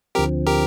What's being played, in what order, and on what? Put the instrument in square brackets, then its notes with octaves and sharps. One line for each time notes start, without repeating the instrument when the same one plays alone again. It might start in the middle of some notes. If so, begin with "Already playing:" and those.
[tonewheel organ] D2 D3 F3 C4 [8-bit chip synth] G4 A#4
[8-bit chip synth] G4 A#4